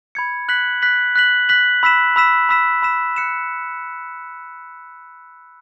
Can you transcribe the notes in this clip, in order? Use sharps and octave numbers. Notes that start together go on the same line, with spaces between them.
B5 G#6 C#7
F#6 B6 F#7
F#6 B6 F#7
F#6 B6 F#7
F#6 B6 F#7
B5 E6 B6 E7
B5 E6 B6 E7
B5 E6 B6 E7
B5 E6 B6 E7
F#6 C#7 E7